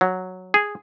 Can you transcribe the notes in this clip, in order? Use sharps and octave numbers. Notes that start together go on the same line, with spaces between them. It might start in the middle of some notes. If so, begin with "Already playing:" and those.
F#3
G#4